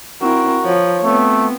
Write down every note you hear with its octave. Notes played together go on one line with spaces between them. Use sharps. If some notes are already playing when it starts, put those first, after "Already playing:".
C4 E4 F#4 A#4
F3 C#5
A3 B3 C4